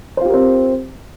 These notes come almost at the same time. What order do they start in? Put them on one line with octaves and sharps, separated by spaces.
C5 F4 G4 A#4 C4